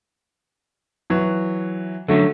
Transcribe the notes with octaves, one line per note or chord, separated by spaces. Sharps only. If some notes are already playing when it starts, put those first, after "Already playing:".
E3 F#3
D3 F#3 A3 C#4